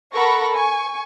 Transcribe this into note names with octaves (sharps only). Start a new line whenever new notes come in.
A4 A#4 F#5 B5 C#6 A#6
G#5 C#6